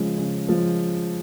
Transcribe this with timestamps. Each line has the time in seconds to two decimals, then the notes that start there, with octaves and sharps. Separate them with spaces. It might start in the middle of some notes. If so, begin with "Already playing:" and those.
Already playing: C#3 F3 G#3
0.18 C#3
0.48 F3 G#3